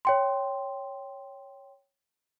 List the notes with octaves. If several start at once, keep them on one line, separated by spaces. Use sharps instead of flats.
C#5 G5 C6